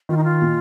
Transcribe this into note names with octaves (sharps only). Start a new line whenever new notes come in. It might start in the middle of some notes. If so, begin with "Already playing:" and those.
D#3 F4
D#4
F4
A#2